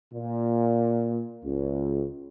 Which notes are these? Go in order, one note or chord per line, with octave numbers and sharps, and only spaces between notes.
A#2
C#2